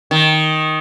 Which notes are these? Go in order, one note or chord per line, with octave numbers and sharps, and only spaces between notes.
D#3